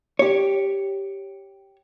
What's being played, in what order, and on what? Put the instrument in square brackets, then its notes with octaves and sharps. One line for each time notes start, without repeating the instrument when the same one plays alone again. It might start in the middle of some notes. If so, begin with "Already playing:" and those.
[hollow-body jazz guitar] G4 C#5